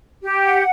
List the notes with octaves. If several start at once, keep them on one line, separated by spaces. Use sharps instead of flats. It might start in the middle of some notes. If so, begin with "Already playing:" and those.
G4
F#5